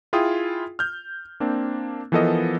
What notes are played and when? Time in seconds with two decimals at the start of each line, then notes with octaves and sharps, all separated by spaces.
0.13 E4 F4 G#4 G5 D#6
0.79 F6 G6
1.40 A#3 C4 D4
2.12 E3 F3 B3 A4 A#4 D#5